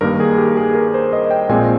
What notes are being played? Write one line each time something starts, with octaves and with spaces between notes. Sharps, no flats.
G2 D#3 A#3 A#4
G#4
G4
G#4
A#4
C5
D#5
G5
A#1 A#2 G#3 C4 G#5